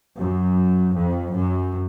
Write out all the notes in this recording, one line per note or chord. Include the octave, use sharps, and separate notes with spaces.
F#2
F2
F#2